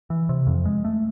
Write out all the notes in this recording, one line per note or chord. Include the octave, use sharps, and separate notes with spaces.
E3
C3
F2
G#3
A3